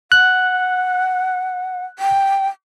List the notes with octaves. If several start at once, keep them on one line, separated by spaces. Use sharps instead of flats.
F#5 F#6
G5